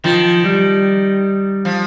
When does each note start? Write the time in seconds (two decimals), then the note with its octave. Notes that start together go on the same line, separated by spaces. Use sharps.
0.04 D#3 F3
0.44 G3
1.65 F3